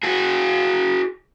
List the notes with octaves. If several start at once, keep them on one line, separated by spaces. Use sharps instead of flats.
F#4 G#4